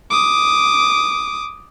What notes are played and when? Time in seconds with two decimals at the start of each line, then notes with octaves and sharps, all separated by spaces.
0.11 D6 D#6